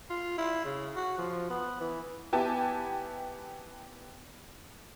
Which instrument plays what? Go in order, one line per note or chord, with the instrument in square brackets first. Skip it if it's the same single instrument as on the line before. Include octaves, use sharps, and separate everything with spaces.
[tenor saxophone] F4
E4
C#3
F#4
F3
B3
E3
[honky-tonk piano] B3 E4 G4 G#5 A5